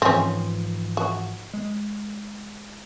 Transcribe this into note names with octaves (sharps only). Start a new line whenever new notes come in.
G#2 E3 F3 C4 C#4
F#4
G#3